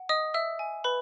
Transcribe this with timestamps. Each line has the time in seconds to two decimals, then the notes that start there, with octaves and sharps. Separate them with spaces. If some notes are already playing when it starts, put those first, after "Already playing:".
Already playing: F#5
0.09 D#5 D#6
0.34 E5 E6
0.59 G#5
0.84 B4 B5